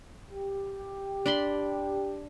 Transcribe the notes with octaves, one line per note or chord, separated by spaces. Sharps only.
G4
D4 B5 C6